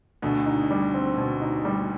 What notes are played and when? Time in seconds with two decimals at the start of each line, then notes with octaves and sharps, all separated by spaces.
0.22 D2 B2 D3
0.46 D#4
0.71 G3
0.94 C4
1.17 B2
1.41 D#4
1.65 G3